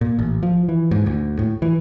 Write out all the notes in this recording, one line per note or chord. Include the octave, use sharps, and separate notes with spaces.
A#2
A1
F3
E3
G#2
D2
A2
E3